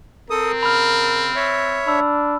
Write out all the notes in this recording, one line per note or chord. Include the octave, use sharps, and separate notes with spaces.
C4 A4 A#4 D#6
C#3 B5 F6
C#5 E5
D4 B5 E6